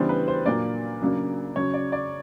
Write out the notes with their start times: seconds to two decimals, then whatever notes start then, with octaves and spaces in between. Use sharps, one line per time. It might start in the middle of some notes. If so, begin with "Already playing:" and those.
Already playing: C#3 E3 G3 B3 D4 C5
0.09 B4
0.28 C5
0.45 A#2 F#3 A#3 D4 D5
1.01 F#2 C#3 F#3 A#3 D4
1.56 F#2 C#3 F#3 C#5
1.74 D5
1.92 D5